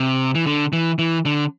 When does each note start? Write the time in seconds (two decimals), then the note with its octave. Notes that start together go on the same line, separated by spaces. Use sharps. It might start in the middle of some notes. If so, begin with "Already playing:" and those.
Already playing: C3
0.35 E3
0.46 D3
0.72 E3
0.99 E3
1.25 D3